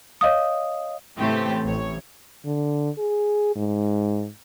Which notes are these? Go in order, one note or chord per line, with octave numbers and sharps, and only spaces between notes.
C#5 D#5 F5 D#6
A2 C#3 E3 A3 C4 G4
A1 C#5
D3
G#4
G#2